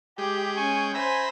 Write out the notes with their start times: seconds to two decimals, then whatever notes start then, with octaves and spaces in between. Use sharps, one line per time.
0.18 G#3 G4 G5
0.56 C#4 G#5 C#6
0.95 C5 E5 G#5 A#5 B5